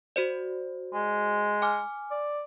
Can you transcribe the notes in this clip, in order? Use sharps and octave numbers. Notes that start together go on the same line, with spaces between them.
F#4 C5 D5
G#3
G#5 D6 F6
D5